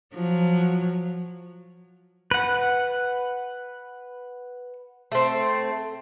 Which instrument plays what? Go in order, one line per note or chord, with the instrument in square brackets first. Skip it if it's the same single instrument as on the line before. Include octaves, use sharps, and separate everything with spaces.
[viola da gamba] F3 F#3
[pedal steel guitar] B4 F#5
[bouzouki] A3 C4